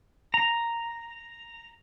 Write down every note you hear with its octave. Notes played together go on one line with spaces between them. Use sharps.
A#5